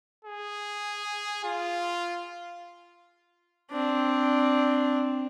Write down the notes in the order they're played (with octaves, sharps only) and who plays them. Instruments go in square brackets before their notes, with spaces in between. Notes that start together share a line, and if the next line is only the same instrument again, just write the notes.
[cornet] G#4
F4
[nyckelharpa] C4 D4